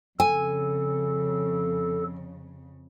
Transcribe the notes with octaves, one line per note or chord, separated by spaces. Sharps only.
F2 C#3 A4 G#5